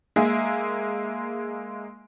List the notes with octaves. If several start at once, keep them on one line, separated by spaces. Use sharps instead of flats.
G#3 A#3 G#4 E5